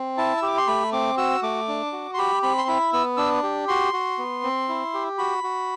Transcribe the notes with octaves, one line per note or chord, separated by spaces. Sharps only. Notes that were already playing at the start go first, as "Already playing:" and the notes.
Already playing: C4
E4 A5
E6
G4 D6
C6
A3 B5
C4 D6
F#4 E6
A3 D6
D4
F#4
C6
G4 B5
C4 B5
C6
E4 B5
B3 E6
D4 E6
G4
F#4 C6
F#4
B3
C4
E4
G4
F#4 B5
F#4